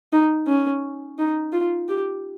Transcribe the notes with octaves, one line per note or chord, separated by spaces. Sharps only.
D#4
C#4
D#4
F4
G4